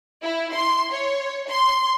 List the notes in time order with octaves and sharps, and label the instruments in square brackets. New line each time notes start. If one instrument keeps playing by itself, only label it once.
[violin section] E4
C6
C#5
C6